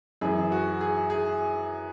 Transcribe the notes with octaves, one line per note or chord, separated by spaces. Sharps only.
F#2 E3 G#4
F#4
G#4
G#4